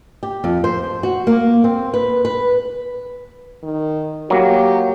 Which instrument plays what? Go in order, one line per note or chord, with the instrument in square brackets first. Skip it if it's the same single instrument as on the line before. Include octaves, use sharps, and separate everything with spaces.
[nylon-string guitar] G4
F2
C5
F#4
A#3
C4
B4
B4
[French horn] D#3
[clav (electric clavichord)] F#3 A#3 [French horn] G4